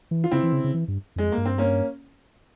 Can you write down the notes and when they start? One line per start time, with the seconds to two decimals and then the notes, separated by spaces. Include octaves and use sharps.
0.11 E3
0.24 F4
0.31 C#3 C4 E4
0.43 E3
0.53 C#3
0.64 C#3
0.74 E3
0.88 G2
1.16 F2 G#3
1.32 A#3
1.38 G2
1.45 C4
1.58 A#3 C#4